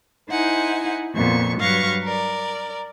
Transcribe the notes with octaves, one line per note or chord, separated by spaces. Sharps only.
D#4 E4 C5 F#5 G#5
F2 A#2 B3 C#6
G2 F#3 B4 F5 C#6 A#6
A#4 D5